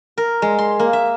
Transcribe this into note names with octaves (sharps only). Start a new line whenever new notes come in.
A#4
G#3
C6
A#3
E5